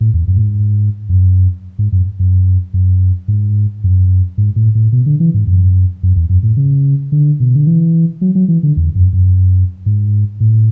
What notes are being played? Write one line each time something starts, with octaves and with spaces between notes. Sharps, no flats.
A2
E2
F#2
A2
G#2
F#2
G#2
F#2
F#2
F#2
G#2
F#2
G#2
A2
A2
B2
D3
E3
G#2
F#2
F#2
E2
F#2
A2
C#3
D3
B2
D3
E3
F#3
F#3
E3
D3
E2
F#2
F#2
G#2
A2